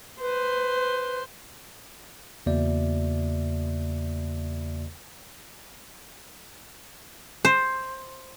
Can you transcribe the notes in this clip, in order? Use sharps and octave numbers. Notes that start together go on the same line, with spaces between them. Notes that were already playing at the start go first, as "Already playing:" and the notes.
B4 C5
E2 C#3 A#3 F#4 D5 E5
C5